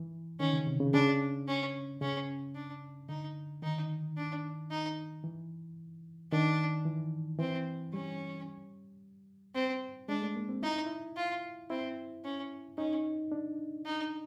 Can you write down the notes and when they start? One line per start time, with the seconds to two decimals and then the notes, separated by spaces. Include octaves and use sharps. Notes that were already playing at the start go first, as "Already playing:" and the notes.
Already playing: E3
0.40 D#3 C#4
0.53 C#3
0.67 C3
0.80 C#3
0.94 C#3 D4
1.47 C#4
2.01 C#3 C#4
2.55 D4
3.09 D3 D#4
3.62 D#3 D#4
4.17 D4
4.71 D#4
5.24 E3
6.32 D#3 D4
6.85 E3
7.39 E3 C4
7.93 G3 C#4
9.55 C4
10.08 G#3 D4
10.22 A3
10.36 A#3
10.49 C4
10.63 D#4 E4
10.86 E4
11.16 F4
11.70 C4 E4
12.24 C#4
12.78 C#4 D#4
13.32 D4
13.85 D#4